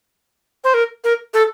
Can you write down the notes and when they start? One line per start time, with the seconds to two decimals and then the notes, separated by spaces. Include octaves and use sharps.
0.64 C5
0.74 A#4
1.04 A#4
1.34 A4